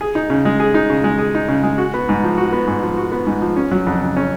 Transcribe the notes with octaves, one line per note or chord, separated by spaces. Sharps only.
G#4
D#4
C#3
G#3
G#4
D#4
C#3
G#3
G#4
D#4
C#3
G#3
F#4
B3
G#2
F3
F#4
B3
G#2
F3
F#4
B3
G#2
F3
C#4
F#3
F2
C#3
C#4